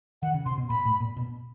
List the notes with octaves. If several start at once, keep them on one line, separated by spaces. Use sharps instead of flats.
D#3 F#5
C#3
C3 C6
B2
A#2 B5
A2
A#2
B2